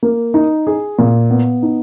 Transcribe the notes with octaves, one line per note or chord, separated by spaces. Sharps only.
A#3
D#4
G#4
A#2
B3
D#4